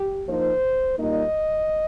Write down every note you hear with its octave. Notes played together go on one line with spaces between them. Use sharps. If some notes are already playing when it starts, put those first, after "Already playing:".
Already playing: G4
F3 A#3 D#4 C5
A#2 G3 A#3 D#4 D#5